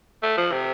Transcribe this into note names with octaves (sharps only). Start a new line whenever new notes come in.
A3
F3
C3